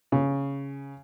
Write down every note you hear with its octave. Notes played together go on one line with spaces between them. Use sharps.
C#3